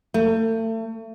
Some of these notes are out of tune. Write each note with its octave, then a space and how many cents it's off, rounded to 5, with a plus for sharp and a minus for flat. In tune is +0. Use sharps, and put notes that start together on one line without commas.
A3 +35